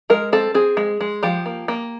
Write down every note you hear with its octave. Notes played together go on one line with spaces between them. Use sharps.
G#3 A#4
C4 A4
C4 G#4
G#3
G#3
F3 G4
A#3
A#3